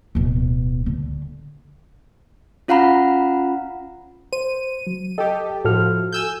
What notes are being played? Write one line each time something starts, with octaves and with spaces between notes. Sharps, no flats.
D1 B2
D3
C#4 F4 F5 F#5 A#5 B5
C5 D#7
F#3
G4 A4 D#5 G5
A2 F3 F#4 A4 F6
G#5 E6 G6